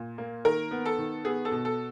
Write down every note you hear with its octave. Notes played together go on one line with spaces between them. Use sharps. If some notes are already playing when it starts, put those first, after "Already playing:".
Already playing: A#2
A#3
D#3 A#4
B3
A4
D#3
B3 G#4
A4
B2
A4